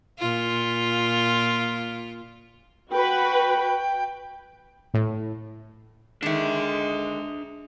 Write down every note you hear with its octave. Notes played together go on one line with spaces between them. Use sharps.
A#2 F4
F#4 B4 G5
A2
D3 D#3 G#3 D4 E5